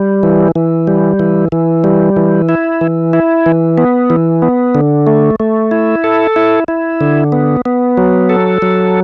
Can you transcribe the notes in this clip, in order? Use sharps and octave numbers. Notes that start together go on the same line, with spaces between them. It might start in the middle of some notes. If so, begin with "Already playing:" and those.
Already playing: G3
E3
E3
G3
E3
E3
G3
E3
E4
E3
E4
E3
B3
E3
B3
D3
A3
A3
E4
A4
E4
E4
D3
B3
B3
F#3
A4
F#3